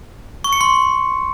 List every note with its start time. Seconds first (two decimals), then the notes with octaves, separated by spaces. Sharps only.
0.44 C#6
0.53 C#7
0.61 C6